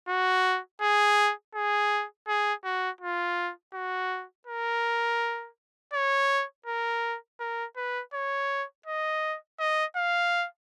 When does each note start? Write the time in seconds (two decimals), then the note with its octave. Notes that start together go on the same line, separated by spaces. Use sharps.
0.08 F#4
0.81 G#4
1.54 G#4
2.28 G#4
2.64 F#4
3.01 F4
3.74 F#4
4.47 A#4
5.93 C#5
6.66 A#4
7.40 A#4
7.76 B4
8.14 C#5
8.86 D#5
9.59 D#5
9.96 F5